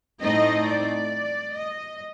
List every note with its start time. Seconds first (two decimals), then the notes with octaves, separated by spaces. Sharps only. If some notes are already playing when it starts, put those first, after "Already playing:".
0.21 A2 A3 C4 D#4 D#5
0.66 D5
1.53 D#5